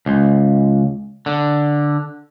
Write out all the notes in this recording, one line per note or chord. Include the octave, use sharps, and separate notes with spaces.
C#2
D3